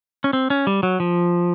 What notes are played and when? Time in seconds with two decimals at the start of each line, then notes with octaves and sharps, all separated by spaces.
0.24 C#4
0.33 C4
0.50 C#4
0.67 G3
0.83 F#3
1.00 F3